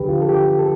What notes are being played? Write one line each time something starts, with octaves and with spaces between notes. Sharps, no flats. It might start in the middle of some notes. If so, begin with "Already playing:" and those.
Already playing: D2 D3 F3 G4 B4
F4
A4
G4
A4